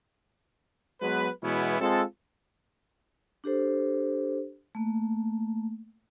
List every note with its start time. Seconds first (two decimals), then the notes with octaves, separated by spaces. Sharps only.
1.01 F#3 G#3 B3 B4
1.43 B2 E3 G#3 B3 C#4 E4
1.81 G#3 C4 F4 A4
3.44 D4 G4 A4 C5
4.75 A3 A#3